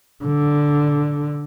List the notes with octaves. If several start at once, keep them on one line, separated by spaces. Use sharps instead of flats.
D3